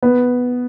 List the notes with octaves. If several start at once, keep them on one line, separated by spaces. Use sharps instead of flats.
B3